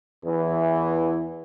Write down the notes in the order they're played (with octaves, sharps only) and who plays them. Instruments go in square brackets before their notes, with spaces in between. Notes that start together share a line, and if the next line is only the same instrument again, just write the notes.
[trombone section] E2 E3